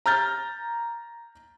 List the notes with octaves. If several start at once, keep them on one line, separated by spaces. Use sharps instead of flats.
A#5 F6 G6 A6